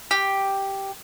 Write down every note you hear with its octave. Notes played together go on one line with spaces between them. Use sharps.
G4